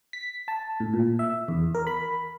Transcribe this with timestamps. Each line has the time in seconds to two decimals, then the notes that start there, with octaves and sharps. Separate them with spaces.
0.13 B6
0.48 A5
0.80 A2
0.93 A#2
1.19 E5
1.48 E2
1.75 A#4
1.87 B5